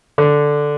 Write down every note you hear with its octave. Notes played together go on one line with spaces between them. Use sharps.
D3